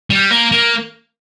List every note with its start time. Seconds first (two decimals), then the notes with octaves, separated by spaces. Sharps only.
0.10 G3
0.31 A#3
0.52 A#3